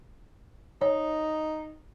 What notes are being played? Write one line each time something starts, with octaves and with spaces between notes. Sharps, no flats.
D#4 C#5